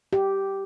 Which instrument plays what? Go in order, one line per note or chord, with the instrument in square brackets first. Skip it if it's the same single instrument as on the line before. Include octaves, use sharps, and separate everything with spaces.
[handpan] G4